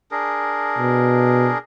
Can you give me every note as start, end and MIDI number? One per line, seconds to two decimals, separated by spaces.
0.11 1.58 62
0.11 1.58 68
0.11 1.58 70
0.78 1.52 47